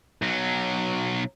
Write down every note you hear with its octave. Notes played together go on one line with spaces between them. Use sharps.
B1 F#3